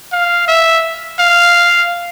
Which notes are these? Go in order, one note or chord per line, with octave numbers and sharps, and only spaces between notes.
F5
E5
F5